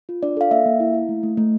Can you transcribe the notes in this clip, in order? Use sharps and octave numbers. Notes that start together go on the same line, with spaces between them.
F4
D4 D5
A4 F5
A#3 E5
A#3
E4
E4
A3
A3
A3